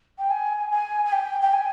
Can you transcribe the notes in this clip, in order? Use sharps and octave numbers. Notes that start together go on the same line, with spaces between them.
G5
G#5
G#5
G#5
G5
G5
G#5